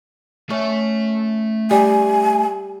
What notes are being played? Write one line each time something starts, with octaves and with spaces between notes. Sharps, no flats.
A3 C#4 E5
G3 G#5